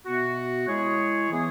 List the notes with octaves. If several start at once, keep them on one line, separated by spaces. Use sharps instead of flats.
B2 B3 F#4 E5
G#3 E4 G#4 C#5
E3 B3 G#4 E5